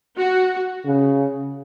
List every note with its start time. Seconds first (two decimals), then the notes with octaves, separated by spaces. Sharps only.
0.16 F#4
0.85 C#3